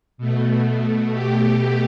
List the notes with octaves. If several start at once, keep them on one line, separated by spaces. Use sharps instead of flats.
B2 A3
G4